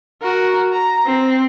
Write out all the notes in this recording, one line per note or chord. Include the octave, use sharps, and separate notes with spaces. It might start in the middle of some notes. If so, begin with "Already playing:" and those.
F#4 A#4
A#5
C4